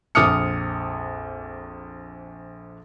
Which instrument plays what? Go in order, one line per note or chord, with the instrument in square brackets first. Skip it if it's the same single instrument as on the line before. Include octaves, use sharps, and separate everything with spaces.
[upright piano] A#1 F2 D6 D#6 F6 C#7